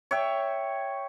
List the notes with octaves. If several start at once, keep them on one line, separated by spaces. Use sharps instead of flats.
C#5 E5 G5